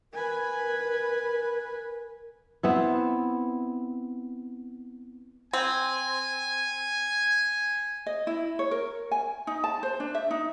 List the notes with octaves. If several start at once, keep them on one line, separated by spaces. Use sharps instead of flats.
A#4 B4 G#5
B3 C4 E4
C4 G#5
D#5
E4
C#5
A#4
G#5
D#4
A5
C5
D4
E5
D#4